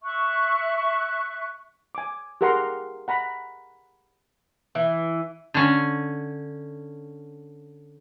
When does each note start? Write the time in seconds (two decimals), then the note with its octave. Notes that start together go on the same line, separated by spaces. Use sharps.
0.03 E5 C#6 F#6
1.95 G#5 D6
2.41 G4 G#4 A#4 F#5 A#5 C6
3.08 F#5 A#5 B5
4.75 E3
5.54 D3 C#4